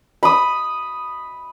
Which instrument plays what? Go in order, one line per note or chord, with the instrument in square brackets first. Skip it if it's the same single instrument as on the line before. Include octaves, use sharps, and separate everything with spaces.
[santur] B5 D#6